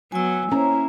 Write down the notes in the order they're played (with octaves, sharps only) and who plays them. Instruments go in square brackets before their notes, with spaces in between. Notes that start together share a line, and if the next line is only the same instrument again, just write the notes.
[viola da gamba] F#3 B3 [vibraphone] G#5 E6
[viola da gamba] A#3 E4 [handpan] C#4 [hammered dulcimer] A#5